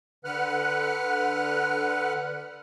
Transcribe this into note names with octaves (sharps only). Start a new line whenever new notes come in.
D3 B4 F#5 F6 F#6